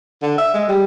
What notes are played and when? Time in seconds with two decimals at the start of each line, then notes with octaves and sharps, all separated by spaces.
0.22 D3
0.38 E5
0.54 G#3
0.69 G3